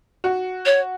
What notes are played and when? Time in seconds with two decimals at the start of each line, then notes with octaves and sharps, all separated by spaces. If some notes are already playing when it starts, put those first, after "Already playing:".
0.24 F#4
0.66 C#5